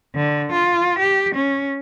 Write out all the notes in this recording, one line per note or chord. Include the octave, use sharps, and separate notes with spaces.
D3
F4
G4
C#4